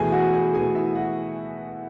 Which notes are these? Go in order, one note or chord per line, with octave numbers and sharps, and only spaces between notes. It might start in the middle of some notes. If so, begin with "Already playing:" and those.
Already playing: E2 B2 A3 G#4 G#5
F#4 F#5
G#4 G#5
E2 B2 A3 G#4 G#5
E4 E5
F#4 F#5